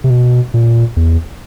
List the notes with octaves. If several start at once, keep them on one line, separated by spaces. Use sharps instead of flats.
C3
B2
A#2
E2